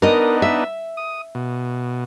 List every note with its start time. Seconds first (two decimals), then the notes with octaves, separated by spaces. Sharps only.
0.02 B3 D4 D#4 A#4 D#5
0.42 E5
0.97 D#6
1.35 B2